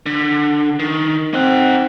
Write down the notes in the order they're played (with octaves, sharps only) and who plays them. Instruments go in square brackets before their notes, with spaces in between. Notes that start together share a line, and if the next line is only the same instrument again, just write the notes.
[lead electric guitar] D3
D#3
[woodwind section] C4 [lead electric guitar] D#4 F#5